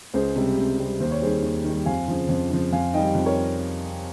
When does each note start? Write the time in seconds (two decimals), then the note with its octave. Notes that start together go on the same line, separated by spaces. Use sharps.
0.14 C#2 G#4 C5
0.36 C3 G3
0.57 C#2
0.78 C3 G3
1.00 D#2 C5
1.11 C#5
1.21 D#3 G3 G#4 C5
1.43 D#2
1.64 D#3 G3
1.86 F2 F5 G#5
2.08 C#3 F3
2.29 F2
2.50 C#3 F3
2.72 F2 F5 G#5
2.93 D#3 G3 D#5 G5
3.15 F2
3.25 A#4 C#5